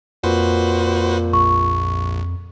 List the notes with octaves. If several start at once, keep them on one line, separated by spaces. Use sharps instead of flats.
F2 A#2 F#4 B4 C5
A#1 C#6